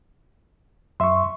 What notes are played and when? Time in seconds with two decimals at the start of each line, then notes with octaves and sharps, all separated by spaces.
1.00 F#2 E5 C6 C#6